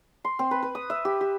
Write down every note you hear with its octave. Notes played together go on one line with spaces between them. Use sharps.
C6
C4
B4
B4
D#6
E5
G4
G4